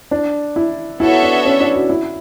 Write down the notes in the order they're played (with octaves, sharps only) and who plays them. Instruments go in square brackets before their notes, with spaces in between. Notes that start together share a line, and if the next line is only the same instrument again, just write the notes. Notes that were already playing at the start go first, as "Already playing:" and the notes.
[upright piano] D4
E4
[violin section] B3 F#4 A4 C#5 E5 [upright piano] E4
[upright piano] D4
C#4
D4
F#4
E4